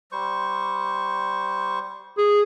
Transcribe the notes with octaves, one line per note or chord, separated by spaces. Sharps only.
G3 C5 C#6
G#4